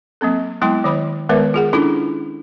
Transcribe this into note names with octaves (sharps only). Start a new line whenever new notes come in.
F#3 A#3 C4 A4
F#3 G#3 B3 E4 G5 C6
D#3 F#3 C5 B5
D#3 G#3 B3 A#4 B4 E5
F4 G#4 F#5
C#4 D4 E4 F4 A4